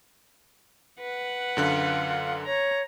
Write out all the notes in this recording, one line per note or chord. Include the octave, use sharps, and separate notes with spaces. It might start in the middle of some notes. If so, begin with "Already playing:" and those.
B4 F#5
F#2 D3 F4 F#6
C#5 A#5